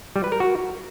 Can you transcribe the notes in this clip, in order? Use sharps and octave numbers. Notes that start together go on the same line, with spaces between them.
G3
B4
A#4
F#4